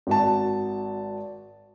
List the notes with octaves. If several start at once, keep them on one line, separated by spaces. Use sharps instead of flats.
G#1 F#4 A5